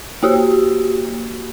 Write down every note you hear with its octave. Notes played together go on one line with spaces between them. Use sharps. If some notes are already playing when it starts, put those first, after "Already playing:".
A#3 F#4 G4